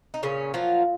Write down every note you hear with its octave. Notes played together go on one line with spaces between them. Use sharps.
D#4
A#2 C#3 C#4
F3 F#3 F4